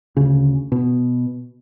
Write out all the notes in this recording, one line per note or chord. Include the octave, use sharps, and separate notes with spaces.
D2 C#3
B2